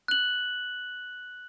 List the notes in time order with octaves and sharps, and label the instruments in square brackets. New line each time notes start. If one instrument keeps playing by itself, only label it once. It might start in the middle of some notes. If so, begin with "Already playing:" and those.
[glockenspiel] F#6 F#7